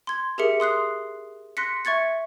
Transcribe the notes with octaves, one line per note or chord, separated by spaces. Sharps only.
C6 G#6
G4 G#4 A#4 E5 C#7
C6 D#6 F#6 C7
C6 F#6 A#6 B6 C#7
E5 C#6 G#6 A6 C#7